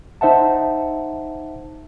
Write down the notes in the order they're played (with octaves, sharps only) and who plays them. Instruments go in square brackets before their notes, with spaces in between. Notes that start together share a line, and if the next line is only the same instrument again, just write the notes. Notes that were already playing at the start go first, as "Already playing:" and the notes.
[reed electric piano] D#4 C5 E5 F#5 A5